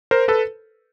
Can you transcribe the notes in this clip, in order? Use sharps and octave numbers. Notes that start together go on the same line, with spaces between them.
A#4 C5
A4 B4